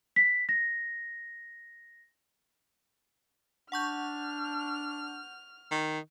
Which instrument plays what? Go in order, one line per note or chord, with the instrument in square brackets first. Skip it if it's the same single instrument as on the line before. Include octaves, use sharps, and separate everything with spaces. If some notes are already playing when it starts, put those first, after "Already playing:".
[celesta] B6
A#6
[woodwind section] D4 [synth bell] F#5 C#6 G6 [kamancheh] F6
[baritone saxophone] D#3